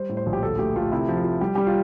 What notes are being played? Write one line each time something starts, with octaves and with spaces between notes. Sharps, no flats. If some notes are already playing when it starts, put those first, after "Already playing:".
Already playing: G3 C5
A2
C5
A#1
G4
D2 A4
A3 G4
A3 F4
C3 E4
F3
F4
F3
G3 G4
G3 G4
F4